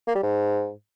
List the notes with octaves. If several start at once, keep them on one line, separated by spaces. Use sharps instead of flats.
A#3
G3
G#2